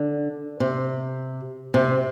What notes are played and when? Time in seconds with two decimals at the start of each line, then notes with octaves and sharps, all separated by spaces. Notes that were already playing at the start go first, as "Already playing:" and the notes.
Already playing: D3
0.60 C3
1.74 C3